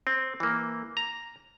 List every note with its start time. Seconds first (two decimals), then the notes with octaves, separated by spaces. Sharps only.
0.07 C4
0.40 E3 A#3
0.97 A#5